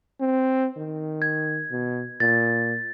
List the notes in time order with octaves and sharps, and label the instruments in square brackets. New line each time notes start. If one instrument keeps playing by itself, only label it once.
[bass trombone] C4
D#3
[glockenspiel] G#6
[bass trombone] B2
[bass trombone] A#2 [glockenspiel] A6